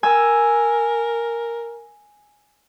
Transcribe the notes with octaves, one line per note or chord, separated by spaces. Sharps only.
A#4 G#5 E6